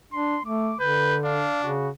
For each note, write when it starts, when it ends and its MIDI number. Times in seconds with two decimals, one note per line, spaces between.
0.13 0.37 62
0.13 0.45 84
0.46 0.73 57
0.46 0.76 86
0.80 1.46 50
0.80 1.17 71
0.80 1.18 91
1.24 1.73 62
1.24 1.58 77
1.63 1.89 49
1.63 1.89 66